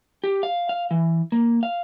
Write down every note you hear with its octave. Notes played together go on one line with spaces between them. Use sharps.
G4
F5
F5
E3
A#3
F5